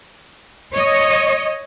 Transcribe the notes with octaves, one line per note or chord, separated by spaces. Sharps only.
C#5 D#5